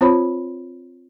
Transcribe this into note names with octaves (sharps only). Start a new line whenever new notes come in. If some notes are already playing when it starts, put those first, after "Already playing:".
C4 F4 C5 C#5 B5